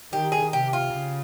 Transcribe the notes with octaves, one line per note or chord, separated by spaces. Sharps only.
D#3 G4
G#4
C3 G4
F4
C#3